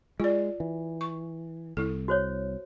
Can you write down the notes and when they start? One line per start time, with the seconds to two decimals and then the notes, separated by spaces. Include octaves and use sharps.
0.20 G#3 F4 D5
0.60 E3
1.01 C#6
1.77 C2 E4 A4
2.08 F#4 C5 C#5